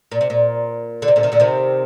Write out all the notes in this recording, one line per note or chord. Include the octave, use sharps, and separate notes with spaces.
A#2
C3
A#2
D3
C3
A#2 D3
C3 D#3
A#2 D3
C3 D#3